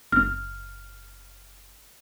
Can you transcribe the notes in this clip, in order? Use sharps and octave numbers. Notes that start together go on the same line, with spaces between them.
F#1 F6